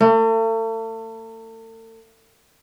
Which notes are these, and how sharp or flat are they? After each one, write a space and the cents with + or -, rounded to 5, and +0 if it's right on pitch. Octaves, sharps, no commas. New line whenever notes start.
A3 +40